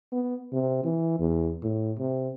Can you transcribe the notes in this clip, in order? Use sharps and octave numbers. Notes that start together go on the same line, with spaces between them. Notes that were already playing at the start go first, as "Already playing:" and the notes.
B3
C3
E3
E2
A2
C3